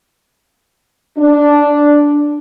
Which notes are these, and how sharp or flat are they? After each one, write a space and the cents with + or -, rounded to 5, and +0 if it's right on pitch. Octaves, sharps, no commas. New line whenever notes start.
D4 -5